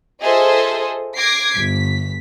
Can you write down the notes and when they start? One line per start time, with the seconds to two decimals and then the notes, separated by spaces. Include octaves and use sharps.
0.22 F4 G#4 A4 C5 D#5 E5
1.18 D6 G#6 A#6 C7
1.54 G1 B6